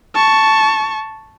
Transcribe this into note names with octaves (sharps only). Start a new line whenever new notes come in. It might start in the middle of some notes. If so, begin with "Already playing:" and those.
A5 C#6